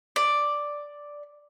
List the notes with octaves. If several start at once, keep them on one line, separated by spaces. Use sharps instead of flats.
D5